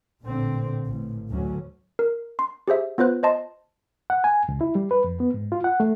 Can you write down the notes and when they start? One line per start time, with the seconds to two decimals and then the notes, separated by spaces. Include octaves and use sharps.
0.22 A1 A#2 D3 C4
0.86 A1
1.29 D2 F#3 C#4
1.99 A#4
2.39 C6
2.68 G4 G#4 C5 E5
2.98 B3 F4 B4 C5 F#6
3.23 C5 D#5 A5 C6
4.10 F#5
4.24 G#5
4.49 C#2
4.61 E4
4.75 G3
4.91 B4
5.04 F2
5.20 B3
5.34 G#2
5.52 F4
5.64 F#5
5.80 A3